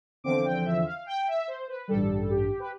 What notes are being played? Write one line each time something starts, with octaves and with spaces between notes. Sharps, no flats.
E2 D3 F3 C4 D6
G5
E5
F5
G5
E5
C5
B4
A1 G2 D3 G3 A4
G4
B4